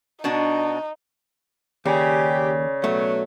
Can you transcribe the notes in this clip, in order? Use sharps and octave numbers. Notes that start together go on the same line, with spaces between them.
B2 D4 D#4 F#4
D#2 C#3 G4 D5 G#5
B2 F#3 A3